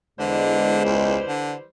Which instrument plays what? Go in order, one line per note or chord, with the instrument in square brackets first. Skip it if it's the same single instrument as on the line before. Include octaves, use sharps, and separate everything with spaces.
[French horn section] E2 G#3 D#5 [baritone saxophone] D3 [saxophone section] E3 G3 C5
[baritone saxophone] C#2
D3